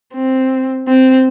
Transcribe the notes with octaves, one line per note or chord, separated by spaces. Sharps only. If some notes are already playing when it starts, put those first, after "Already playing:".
C4
C4